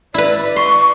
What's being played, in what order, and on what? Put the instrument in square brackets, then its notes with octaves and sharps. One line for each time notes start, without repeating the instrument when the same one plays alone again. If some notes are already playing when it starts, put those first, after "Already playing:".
[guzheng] E4 B4 [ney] D5
[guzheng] C6 [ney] C#6